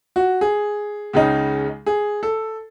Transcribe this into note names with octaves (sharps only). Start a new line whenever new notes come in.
F#4
G#4
C#2 C#3 G#3 D#4
G#4
A4